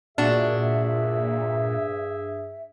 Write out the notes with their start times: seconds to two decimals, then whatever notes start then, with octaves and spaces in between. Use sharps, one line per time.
0.18 G2 A#2 D4 F#4 G#4 E5